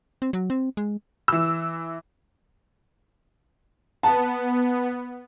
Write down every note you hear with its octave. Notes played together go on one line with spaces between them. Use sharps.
C4
F#3
C4
G#3
E3 E6
B3 A5